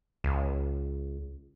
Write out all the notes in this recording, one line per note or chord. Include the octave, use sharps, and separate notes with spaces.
C#2